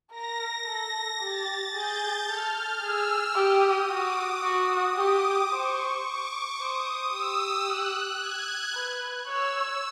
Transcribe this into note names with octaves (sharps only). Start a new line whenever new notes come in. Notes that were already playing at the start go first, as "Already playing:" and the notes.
A#4 A#6
A4
G4 A6
G#4 G6
A4 F6
G#4 E6
G4 D#6
F#4 D6
F#4 D#6
G4 D6
C5 C#6
D6
C5 D#6
G4 E6
F#6
G#6
B4
C#5 E6